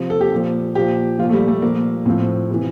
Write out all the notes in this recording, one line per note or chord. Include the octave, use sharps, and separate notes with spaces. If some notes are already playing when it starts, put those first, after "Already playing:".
Already playing: C3 F3
A4
G4
A#2 F3
A#2 F3 G4
F3 F4
A#2
A3
G3
A3
A#2 F3 A#3
A2 F3 C4
C3 E3